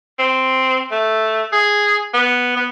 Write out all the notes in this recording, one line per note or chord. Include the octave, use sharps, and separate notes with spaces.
C4
A3
G#4
B3
B3